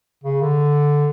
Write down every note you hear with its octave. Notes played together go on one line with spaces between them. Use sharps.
C#3
D3